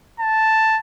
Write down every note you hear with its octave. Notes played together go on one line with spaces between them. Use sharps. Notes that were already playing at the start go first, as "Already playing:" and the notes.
A5